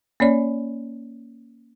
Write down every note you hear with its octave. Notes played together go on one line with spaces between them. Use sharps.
A#3 C#4 C#5 D5